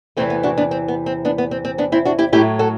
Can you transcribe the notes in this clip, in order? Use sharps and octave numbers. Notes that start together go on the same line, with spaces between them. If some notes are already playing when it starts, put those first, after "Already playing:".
E2 C3 E3 A3 C4
B3
D4 F#4
B3 D4
C4
B3
C4
B3 D4
B3
C4
C4
B3 D4
C4 E4
D4 F#4
E4 G4
A2 F#3 A3 E4 G4
F#4 A4